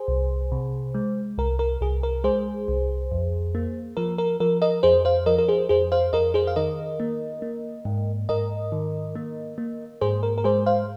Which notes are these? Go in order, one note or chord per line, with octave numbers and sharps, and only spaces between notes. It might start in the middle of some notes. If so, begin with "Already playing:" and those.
Already playing: G#4 C5
C2
C3
G#3
C2 A#4
A#4
C2 G#4
A#4
G#3 G#4 C5
C2
F2
A#3
F3 A#4
A#4
F3 A#4
A#4 D#5
F2 G#4 C5
C5 F5
F3 A#4 D#5
A#4
G#4 C5
F2 G#4 C5
C5 F5
F2 A#4 D#5
G#4 C5
F5
D#3 A#4 D#5
A#3
A#3
G#2
G#2 A#4 D#5
D#3
A#3
A#3
G#2 G#4 C5
A#4
A#4
G#3 G#4 C5
C5 F5